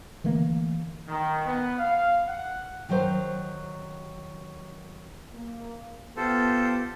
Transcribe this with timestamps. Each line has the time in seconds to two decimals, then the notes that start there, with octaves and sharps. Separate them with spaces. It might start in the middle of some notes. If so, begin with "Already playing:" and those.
0.24 D3 E3 A3 A#3
1.08 D#3
1.45 B3
1.78 F5
2.27 F#5
2.89 D#3 F#3 A#4 C5
5.33 A#3
6.17 B3 F4 G4 A4 C5